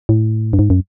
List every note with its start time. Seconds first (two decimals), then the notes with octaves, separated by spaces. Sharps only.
0.09 A2
0.53 G2
0.59 G#2
0.70 F#2